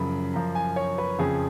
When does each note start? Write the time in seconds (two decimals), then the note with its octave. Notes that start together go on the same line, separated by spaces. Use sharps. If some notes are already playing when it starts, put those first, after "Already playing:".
Already playing: F#2 C#3 F3 B5
0.34 F#2 F3 A#5
0.55 G#5
0.76 C#5
0.98 B4
1.19 F2 C#3 F3 G#4